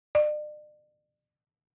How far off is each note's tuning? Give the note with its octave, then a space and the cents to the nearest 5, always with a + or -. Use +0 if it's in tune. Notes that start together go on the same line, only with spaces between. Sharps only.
D5 +40